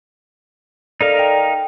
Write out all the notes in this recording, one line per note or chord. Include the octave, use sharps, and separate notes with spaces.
D#4 A4 A#4 D5 F5
G5